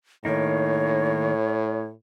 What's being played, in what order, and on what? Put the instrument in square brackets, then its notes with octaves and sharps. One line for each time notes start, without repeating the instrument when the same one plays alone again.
[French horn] A2 [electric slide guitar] D#3 A#3 D#4 [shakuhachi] C#5